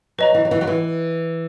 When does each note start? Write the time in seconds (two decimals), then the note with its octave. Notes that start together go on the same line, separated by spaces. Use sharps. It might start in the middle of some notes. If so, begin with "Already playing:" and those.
0.18 F#3 B4 D#5 A#5
0.34 E3
0.45 F#3
0.51 E3
0.61 F#3
0.67 E3